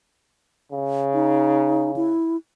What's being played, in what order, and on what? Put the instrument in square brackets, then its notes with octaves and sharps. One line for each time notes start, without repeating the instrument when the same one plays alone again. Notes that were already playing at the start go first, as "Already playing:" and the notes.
[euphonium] C#3
[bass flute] D#4
E4